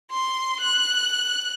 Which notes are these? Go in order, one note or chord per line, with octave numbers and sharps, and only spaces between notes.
C6
F#6